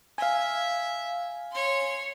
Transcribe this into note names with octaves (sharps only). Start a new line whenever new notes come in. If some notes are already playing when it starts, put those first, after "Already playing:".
E5 F5 G#5
C#5 C6